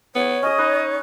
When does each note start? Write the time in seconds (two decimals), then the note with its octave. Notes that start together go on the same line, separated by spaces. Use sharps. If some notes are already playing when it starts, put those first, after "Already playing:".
0.15 B3 C#5
0.43 C#4 G#4 D#5
0.58 D#4 B4